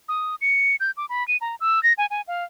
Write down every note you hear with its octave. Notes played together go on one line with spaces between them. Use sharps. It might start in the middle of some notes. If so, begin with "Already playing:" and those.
D#6
C#7
G6
D6
B5
D#7
A#5
E6
A#6
G#5
G#5
F5